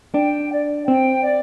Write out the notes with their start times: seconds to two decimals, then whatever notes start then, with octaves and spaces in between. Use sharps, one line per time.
0.14 D4 G5
0.50 D5
0.87 C4 G5
1.24 D5